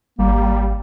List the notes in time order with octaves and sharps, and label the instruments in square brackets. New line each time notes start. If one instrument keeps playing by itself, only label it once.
[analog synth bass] G#1 [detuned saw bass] G3 [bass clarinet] A#3